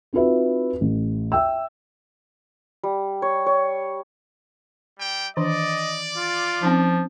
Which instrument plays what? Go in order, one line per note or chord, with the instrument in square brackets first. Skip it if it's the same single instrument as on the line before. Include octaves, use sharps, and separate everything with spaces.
[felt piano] C4 D#4 F4 F#4 B4 E5
A1
E5 G5 E6
[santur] G3
C#5
C#5
[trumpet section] G3 G5
[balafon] D#3 E3 D4 [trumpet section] D5 [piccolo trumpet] D#5
[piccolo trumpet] F4
[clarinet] F3 [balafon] C4 C#4 D#4